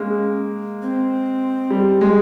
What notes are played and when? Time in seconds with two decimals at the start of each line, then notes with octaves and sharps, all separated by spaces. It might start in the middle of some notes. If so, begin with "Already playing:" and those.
Already playing: G#3 A#3 C#4
0.82 C4
1.71 G3
2.01 G#3